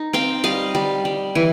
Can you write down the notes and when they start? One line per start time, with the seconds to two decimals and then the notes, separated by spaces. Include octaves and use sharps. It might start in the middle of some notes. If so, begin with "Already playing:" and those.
Already playing: D#4
0.13 C4 F5 G5
0.44 G3 D#5 F5
0.75 G3
1.05 G3
1.35 E3